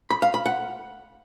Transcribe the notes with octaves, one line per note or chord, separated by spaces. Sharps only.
B5
F5
B5
F#5